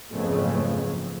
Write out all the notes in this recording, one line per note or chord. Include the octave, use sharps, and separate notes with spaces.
F#1 F2 G#2 C#3 A3 B3